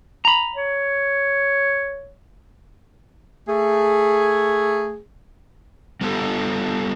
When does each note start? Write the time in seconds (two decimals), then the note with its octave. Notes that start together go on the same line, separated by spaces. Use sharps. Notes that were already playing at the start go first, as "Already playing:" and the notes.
0.25 A#5 B5
0.56 C#5
3.47 A3 G#4
6.01 G3 B3 F4 G4 A4